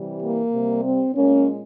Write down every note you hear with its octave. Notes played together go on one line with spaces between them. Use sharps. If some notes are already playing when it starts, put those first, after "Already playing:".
Already playing: C3 E3 G3
A#3
C3 G3
C4
A#2 G#3 A#3 C#4